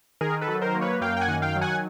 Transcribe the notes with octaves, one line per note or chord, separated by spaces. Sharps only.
D#3 G#4 A#4
A4 B4
F#3
A#4 C5
A#3
B4 C#5
F#2 F5 G5
G5
F#5 G#5
D#3
F5 G5
F#3
F#5 G#5